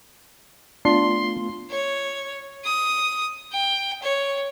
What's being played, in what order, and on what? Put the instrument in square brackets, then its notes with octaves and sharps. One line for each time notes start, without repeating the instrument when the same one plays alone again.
[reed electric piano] A3 B3 F4 [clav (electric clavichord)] D4 [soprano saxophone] C6
[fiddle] C#5
D#6
G5
C#5